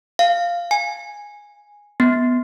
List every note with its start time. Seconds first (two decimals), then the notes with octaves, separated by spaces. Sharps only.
0.19 F5
0.71 G#5
2.00 B3